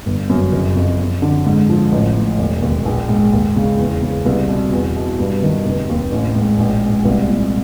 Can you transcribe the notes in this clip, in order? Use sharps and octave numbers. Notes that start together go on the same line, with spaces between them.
G1
F#2
F#1
F2
F2
D3
G#2
F3
A1
A2
E1
D#2
A#1
G#2
D#2
C#3
E2
C#3
C2
B2
E2
B2
G2
D#3
F1
D#2
A1
G#2
A#1
G#2
C2
A#2